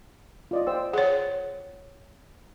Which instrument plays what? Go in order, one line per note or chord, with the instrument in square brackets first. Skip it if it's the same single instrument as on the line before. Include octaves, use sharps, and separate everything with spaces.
[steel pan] F4 D5 D#5
C5 G5 E6
[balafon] G#4 C#5 [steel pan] F#5